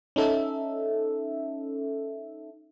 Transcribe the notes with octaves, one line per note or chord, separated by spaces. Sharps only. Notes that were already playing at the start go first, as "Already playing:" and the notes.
C#4 D#4 A4 E5